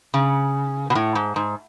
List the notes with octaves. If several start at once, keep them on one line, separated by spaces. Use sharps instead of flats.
C#3
B2
A2
G#2
G#2